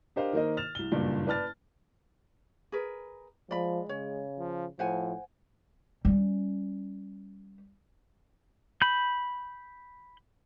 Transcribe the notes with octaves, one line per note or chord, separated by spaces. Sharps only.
D4 G4 A#4 C5 D#5 F5
D#3 A#3 A#4 C5 D#5
F6 A6 E7 F7
C2 G7
F#1 G2 A#2 D5
B4 D5 A5 F6 A6
G#4 A#4 B4
F3 G#3 D5 B5
C#3 C#5
F3
A2 F3 C5 F#5 G#5
G3 C#4
B5 G6